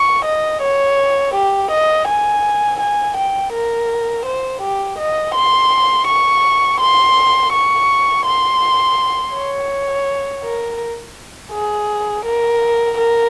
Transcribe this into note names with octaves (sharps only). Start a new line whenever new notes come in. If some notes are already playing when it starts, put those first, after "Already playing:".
Already playing: C#6
D#5
C#5
G4
D#5
G#5
G#5
G5
A#4
C5
G4
D#5
C6
C#6
C6
C#6
C6
C#5
A#4
G#4
A#4
A#4